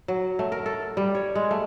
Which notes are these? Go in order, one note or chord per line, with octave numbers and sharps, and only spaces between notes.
F#3
A3
A#4
A4
G3
C#5
G#3
A3